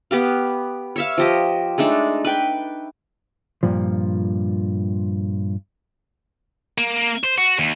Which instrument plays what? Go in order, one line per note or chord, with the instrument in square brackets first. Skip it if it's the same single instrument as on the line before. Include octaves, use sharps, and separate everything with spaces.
[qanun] B3 G4 F5
C#5 E5 F5
F3 G4 D#5
G#3 A3 D4 D#4
B4 G5
[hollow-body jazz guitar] G2 A#2 F3
[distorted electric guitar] A#3
C5
F#4
D#2